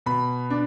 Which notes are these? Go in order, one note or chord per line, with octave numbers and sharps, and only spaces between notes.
B2 B5
D4